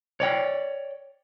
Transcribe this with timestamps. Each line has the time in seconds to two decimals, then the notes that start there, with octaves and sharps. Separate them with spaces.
0.20 C#5 D5 G5